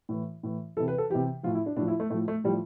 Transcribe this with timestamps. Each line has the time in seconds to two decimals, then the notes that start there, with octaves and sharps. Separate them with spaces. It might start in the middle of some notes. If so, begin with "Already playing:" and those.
0.09 A2 E3
0.43 A2 E3
0.77 E3 A4
0.80 C3
0.88 B4
0.98 A4
1.10 C3 E3 G4
1.43 A2 F3 F4
1.55 E4
1.66 D4
1.77 A2 F3 D4
1.88 E4
2.00 A3
2.10 A2 F3 A3
2.28 A3
2.44 A2 F3 G3